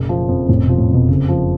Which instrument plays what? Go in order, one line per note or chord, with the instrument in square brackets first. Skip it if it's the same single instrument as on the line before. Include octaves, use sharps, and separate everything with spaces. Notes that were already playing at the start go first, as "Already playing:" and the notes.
Already playing: [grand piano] F#1 [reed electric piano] B2
[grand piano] F3
F2
[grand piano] F1 [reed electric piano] A2
[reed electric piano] B2 [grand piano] F3
[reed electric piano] A2
[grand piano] F2
[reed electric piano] B2
[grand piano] F#1 [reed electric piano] C#3
[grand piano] F3